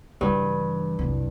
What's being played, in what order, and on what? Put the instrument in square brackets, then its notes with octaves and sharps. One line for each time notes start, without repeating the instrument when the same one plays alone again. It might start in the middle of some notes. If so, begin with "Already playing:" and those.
[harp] G2 [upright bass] C#3 E3
[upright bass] C2 F2